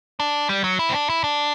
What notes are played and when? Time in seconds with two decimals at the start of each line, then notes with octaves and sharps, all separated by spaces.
0.20 D4
0.49 G3
0.64 F#3
0.79 E4
0.89 C4
0.94 D4
1.10 E4
1.24 D4